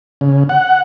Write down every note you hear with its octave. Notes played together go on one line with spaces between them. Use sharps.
C#3
F#5